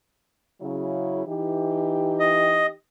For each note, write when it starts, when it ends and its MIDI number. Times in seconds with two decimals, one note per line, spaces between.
0.61 1.25 49
0.61 1.25 54
0.61 1.25 64
1.26 2.72 52
1.26 2.72 63
1.26 2.72 67
2.20 2.67 75